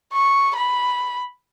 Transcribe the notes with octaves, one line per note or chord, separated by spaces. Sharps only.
C#6
B5